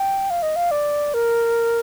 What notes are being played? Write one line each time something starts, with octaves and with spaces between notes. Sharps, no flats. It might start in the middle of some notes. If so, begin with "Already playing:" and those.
Already playing: G5
F5
D#5
F5
D5
A#4